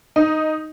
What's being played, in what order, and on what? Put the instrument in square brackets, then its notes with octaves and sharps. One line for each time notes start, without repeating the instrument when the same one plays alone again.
[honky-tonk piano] D#4